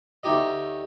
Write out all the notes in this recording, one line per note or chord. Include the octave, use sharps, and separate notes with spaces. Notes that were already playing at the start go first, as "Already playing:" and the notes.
D2 A3 D#4 G4 D#5